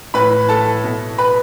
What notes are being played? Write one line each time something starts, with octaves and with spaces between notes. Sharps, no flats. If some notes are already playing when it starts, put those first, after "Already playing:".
A2 E3 B4 B5
A4 A5
B2
B4 B5